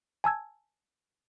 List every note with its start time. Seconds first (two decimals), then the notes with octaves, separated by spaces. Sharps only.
0.24 G#5 A5 E6 G#6